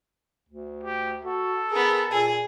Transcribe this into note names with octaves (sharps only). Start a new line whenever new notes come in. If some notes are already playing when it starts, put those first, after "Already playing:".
D2
G4
F#4 A4
B3 G#4 A#4
A#2 G#4